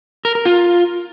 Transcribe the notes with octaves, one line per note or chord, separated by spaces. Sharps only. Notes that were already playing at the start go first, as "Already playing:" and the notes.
A#4
A#4
F4